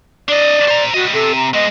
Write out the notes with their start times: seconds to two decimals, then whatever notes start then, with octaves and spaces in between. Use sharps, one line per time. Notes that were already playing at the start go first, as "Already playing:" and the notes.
0.29 D4 D5 D#5
0.68 C5 A#5
0.94 G3 F#4 D#5
1.14 C3 A4
1.35 A#5
1.54 G#3 B3 D#5